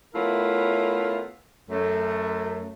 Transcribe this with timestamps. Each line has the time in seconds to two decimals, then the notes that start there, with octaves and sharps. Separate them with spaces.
0.14 A3 B3 C#4 E4 F4 A#4
1.69 F#2 A3